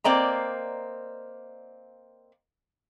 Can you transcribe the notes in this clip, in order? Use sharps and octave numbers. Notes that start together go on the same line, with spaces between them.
A#3 C4 D5 D#5 A#5